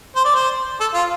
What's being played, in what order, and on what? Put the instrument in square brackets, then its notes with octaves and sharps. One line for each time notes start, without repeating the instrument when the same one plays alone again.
[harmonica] C5
D5
C5
A4
F4